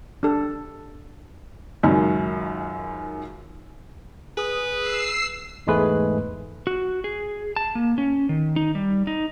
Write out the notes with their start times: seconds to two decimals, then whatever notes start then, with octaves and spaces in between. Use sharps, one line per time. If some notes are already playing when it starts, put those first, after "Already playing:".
0.23 D4 G4 A4 D5
1.83 C#2 F#2 D#3 F#3
4.37 G#4 B4 D#6
4.78 E6 C7
5.67 E2 G#2 G#3 A3 G#4 B4
6.67 F#4
7.04 G#4
7.56 A5
7.75 A#3
7.98 C#4
8.29 D#3
8.56 D#4
8.75 G3
9.07 D#4